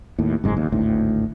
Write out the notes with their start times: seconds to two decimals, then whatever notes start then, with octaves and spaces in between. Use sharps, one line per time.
0.18 D#2 A2
0.44 F#1 G#2 G#3
0.57 D#2
0.72 G#1 D2 A2